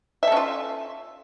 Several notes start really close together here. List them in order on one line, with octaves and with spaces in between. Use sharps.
E5 A4 C#4 F4